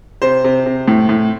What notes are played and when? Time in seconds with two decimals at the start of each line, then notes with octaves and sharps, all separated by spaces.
0.22 C3 C5
0.44 C3
0.66 C3
0.88 A2
1.09 A2